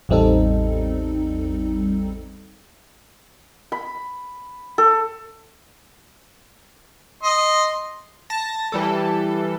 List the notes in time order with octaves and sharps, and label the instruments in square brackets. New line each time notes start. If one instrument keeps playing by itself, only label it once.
[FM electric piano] A1 E2 G3 C4 D#4 A4
[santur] B5
A4
[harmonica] D#5 C6
[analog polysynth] A5 A#6
E3 G3 A4